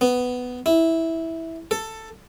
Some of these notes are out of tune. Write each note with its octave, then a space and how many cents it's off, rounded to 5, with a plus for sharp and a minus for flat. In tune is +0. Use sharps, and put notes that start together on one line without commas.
B3 +10
E4 -10
A4 +10